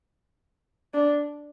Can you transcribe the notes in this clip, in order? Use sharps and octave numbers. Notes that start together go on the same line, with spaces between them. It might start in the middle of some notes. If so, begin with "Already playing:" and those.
D4